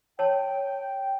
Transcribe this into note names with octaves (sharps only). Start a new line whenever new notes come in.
C#5 G5 A5